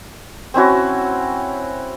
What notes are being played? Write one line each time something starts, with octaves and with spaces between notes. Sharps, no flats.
C4 C#4 E4 F#4